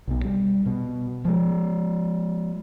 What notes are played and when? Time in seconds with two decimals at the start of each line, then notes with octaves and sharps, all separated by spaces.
0.08 B1 B2
0.25 G3
0.66 B2
1.25 F3 G#3